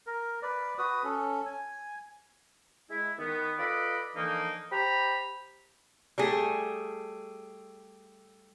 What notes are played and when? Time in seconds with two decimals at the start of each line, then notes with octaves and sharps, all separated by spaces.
0.07 A#4
0.43 B4 D5
0.78 F#4 B4 D#6
1.04 C#4 A4
1.45 G#5
2.90 G#3 E4
3.18 D#3 B3
3.58 F4 A4 B4 D5 D#5 B5
4.15 D3 E3 F3 A#3 D#4
4.71 G4 C5 A#5 B5
6.18 G3 A3 G#4